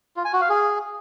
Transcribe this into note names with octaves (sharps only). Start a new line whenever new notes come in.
F4
G#5
F#4
F5
G#4